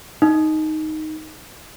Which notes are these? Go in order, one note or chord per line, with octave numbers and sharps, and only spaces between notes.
D#4